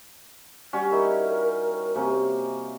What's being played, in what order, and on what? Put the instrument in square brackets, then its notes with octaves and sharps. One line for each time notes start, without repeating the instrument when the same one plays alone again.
[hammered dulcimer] G3 C#4 F#4
[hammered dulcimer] D#4 E4 [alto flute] A#4
[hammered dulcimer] C3 A#3 C#4